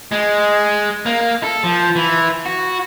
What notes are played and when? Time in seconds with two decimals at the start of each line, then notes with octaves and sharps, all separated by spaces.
0.12 G#3
1.06 A#3
1.43 A4
1.64 F3
1.96 E3
2.46 F#4